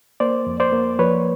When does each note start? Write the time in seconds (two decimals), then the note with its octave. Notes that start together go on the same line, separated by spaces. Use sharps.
0.20 A#3 C5 D5
0.46 F2
0.60 C5 D5
0.73 A#3
0.99 F3 B4 C#5